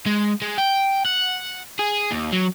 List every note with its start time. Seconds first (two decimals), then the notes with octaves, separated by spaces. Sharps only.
0.06 G#3
0.42 G#3
0.58 G5
1.05 F#5
1.79 G#4
2.11 D#2
2.33 F#3